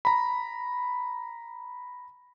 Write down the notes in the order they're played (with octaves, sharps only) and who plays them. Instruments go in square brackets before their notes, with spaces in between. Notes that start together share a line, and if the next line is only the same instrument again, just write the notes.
[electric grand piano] A#5 B5